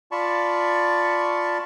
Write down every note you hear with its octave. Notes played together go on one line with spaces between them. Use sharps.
F4 D5 A5 B5 C#6